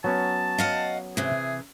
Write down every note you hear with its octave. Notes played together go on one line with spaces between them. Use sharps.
F#3 B3 C#4 A5
D#5 F5 F#5
C3 E3 G#4